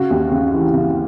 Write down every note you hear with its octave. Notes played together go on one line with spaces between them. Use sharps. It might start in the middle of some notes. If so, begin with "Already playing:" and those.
Already playing: C#3 F#4
D#2
C#3
E3
C#3